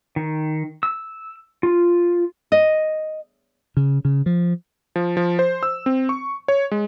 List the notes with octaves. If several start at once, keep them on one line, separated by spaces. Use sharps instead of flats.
D#3
E6
F4
D#5
C#3
C#3
F3
F3
F3
C5
E6
C4
C#6
C#5
G#3